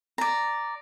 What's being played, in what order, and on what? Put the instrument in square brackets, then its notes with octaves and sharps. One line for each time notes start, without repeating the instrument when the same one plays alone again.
[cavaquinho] D5 A#5